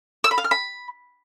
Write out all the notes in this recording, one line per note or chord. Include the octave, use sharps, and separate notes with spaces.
E6
B5
F5
F6
B5